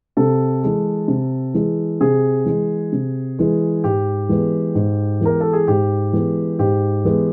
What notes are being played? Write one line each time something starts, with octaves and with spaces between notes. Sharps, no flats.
C3 A4
E3 G#3
C3
E3 G#3
C3 G#4
E3 G#3
C3
E3 G#3
G#2 G4
E3 G#3 B3
G#2
E3 G#3 B3 A#4
A4
G#4
G#2 G4
E3 G#3 B3
G#2 G4
E3 G#3 B3